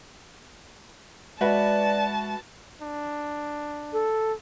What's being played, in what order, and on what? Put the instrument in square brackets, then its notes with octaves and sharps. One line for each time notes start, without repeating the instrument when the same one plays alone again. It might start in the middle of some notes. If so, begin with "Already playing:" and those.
[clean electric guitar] G#3 E5 [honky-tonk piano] F#4 B4 [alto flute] D5 [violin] A5
[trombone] D4
[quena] A4